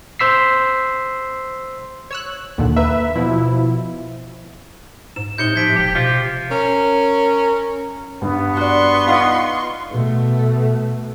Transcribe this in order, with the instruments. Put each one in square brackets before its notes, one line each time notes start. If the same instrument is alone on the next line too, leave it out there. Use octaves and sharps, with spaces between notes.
[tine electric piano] C5 C6 E6 B6 C7
[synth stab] C#5 E6 F#6
D#2 A#2 D3
[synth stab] A#3 [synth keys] B4 E5
[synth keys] B2 F3 E4
[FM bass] G#2 [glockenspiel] E7
[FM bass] A2 [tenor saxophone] C3 [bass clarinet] D#4 [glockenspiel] G6 C#7 G7
[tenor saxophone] C3 [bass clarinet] F3 [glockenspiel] G#6 B6 D7
[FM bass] E1 [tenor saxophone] G4
[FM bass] B2 [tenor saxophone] F3 [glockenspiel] G7
[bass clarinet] C3
[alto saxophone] C#4 [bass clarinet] A#4
[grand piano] G2 [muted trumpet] B3
[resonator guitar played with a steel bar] F#4 D5 [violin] C6 C#6
[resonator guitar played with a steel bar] D#4 F4 D#5 [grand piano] F5 F#5
[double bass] B2 A3